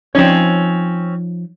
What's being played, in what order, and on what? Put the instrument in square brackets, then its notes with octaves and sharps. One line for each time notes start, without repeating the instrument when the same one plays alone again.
[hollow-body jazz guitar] F3 D#4 C#5 [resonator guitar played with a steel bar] C4 C#4